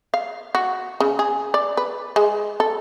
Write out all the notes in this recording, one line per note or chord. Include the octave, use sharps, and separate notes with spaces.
F5
F#4
C#3
G#4
D5
B4
G#3
A4